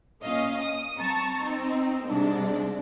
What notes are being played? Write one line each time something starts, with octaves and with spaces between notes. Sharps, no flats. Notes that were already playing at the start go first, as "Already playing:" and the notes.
A#2 C#4 D#5 F5
D#6
C4 A5 A#5 C#6
C4 D#4
G#2 C3 G3 D4